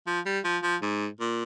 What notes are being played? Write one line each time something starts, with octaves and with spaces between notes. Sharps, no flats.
F3
G3
F3
F3
G#2
A#2